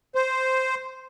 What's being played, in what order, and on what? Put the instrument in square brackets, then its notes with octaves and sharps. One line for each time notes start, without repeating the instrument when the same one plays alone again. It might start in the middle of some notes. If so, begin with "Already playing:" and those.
[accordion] C5